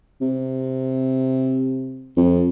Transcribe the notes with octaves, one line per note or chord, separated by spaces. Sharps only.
C3
F2